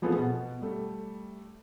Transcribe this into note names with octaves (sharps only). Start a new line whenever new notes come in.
E3 F3 B3 C4 G#4 A4
B2
G3 A3